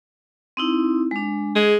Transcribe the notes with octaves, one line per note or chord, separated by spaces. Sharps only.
C4 D#4 E4
G#3 D4
G#3 G#4